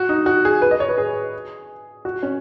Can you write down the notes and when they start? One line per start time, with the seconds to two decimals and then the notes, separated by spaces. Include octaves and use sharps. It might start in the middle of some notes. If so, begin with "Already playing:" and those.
Already playing: F#4
0.09 D#4
0.26 F#4
0.45 G#4
0.62 B4
0.71 D#5
0.80 C#5
0.89 B4
0.98 G#4
2.05 F#4
2.23 C#4